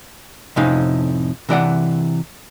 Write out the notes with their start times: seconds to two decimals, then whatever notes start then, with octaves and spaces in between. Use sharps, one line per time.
0.56 F2 A2 C3 C#4 D#4 F5
1.49 C3 E3 D5 F#5